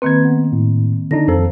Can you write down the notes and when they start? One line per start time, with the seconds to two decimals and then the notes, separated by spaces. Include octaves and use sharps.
0.02 D#3 A#3 C4 B4 G#6
0.25 B3
0.52 A2
1.11 D3 D4 D#4 A#6
1.28 F2 F3 A4 C5 A#5